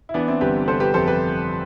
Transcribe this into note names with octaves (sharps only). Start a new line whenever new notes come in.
E4
E3 B3 D4
C4 E4
G1 G4 B4
C3 A4 C5
G4 B4
F2 A4 C5
G4 B4